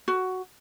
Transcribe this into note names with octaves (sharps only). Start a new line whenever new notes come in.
F#4